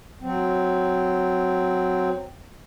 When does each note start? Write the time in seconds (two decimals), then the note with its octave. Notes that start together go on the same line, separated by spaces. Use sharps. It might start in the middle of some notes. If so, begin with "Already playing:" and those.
0.21 F#3 C4